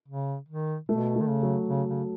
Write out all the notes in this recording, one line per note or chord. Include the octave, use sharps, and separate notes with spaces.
C#3
D#3
B2 A3
A3
D#3
C#3
F#3
C#3
C#3